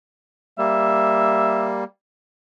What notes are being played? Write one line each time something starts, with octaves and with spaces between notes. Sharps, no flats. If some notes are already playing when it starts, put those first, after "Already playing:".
G3 A#3 E5